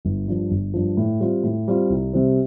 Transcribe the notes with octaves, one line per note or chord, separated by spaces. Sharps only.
G1
G2 F3
G1
G2 F3
A2
G3 C4 F4
A2
G3 C4 F4
C2
C3 G3 C4